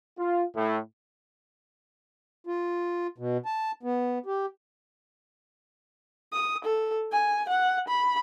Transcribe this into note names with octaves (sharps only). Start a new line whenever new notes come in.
F4
A2
F4
B2
A5
B3
G4
D#6
A4
G#5
F#5
B5